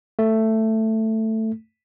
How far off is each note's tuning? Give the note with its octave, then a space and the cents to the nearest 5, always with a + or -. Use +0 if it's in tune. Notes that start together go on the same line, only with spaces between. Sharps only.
A3 +10